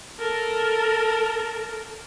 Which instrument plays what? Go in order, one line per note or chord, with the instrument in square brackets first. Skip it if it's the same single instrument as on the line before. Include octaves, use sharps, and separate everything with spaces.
[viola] A4 A#4